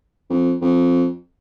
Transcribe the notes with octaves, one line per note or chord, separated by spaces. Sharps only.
F2
F2